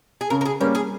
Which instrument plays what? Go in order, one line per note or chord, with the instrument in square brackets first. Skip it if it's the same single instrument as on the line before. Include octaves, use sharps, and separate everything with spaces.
[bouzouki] G#4
[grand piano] C#3 [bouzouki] A#4
[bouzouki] A#4
G#4
[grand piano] G3 A#3 C#4 [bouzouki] G4
[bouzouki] G#4